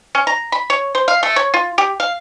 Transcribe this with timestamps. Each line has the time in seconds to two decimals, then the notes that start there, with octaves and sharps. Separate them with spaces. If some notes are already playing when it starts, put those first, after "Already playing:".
0.15 C#4
0.27 A#5
0.52 B5
0.70 C#5
0.95 C5
1.08 F5
1.23 A3
1.36 C#5
1.54 F4
1.78 G4
2.00 F5